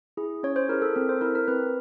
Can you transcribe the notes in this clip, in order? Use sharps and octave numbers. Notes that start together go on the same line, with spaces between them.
E4 G#4
C#4 C#5
C5
E4 G#4 A#4
A4
C4 A#4
C5
E4 A4 A#4
A#4
C4 B4